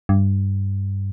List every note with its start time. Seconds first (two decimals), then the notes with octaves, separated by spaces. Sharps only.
0.09 G2